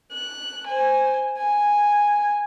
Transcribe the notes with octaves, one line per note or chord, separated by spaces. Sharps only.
F#6
C5 G#5
G#5